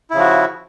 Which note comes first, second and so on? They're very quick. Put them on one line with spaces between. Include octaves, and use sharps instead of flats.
E4 C#3 F3 F#4